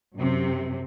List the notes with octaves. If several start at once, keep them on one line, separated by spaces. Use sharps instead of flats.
F#2 C3